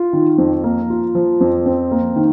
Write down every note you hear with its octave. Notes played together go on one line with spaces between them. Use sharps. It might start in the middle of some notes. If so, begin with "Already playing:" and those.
Already playing: F4
D#3
F2
A#3
F4
F3
F2
C4
A#3
D#3